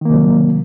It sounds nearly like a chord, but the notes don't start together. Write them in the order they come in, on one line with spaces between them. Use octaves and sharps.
D#3 A#3 C3 F#3